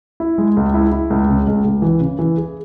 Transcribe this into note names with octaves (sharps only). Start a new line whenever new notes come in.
E4
G#3
C#2
E4
E4
C#2
C#3
C#2
C#2
E3
C#3
E3
G#4